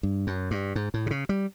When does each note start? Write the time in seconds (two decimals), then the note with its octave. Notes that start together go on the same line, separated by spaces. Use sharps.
0.03 G2
0.27 F#2
0.51 G2
0.75 G#2
0.94 A2
1.06 C3
1.11 C#3
1.29 G3